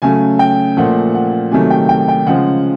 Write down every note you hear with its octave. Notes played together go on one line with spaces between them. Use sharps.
C#3 F#3 A3 G#5
G5
A#2 F3 A3 F#5
F#5
C3 D#3 F#3 A3 G#5
G5
G5
G5
C#3 F3 G#3 F#5